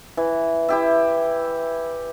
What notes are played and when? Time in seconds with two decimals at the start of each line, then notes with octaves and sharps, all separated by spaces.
0.17 E3
0.69 E4 G4 E5